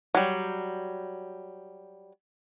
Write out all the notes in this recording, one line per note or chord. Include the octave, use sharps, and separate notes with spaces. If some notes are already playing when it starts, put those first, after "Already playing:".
F#3 G3